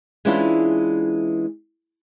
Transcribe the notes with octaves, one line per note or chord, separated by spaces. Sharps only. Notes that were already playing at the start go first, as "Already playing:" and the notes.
E3 G#3 C#4 D4 E4 F4